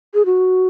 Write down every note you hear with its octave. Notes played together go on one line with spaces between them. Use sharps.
G#4
F#4